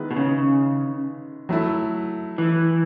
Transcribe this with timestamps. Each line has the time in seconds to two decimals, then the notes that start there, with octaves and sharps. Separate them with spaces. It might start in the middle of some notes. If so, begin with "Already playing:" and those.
Already playing: D#3 G#3 B3 E4 B4
0.11 B2
0.16 C#3
1.49 F#3 A3 E4
2.38 E3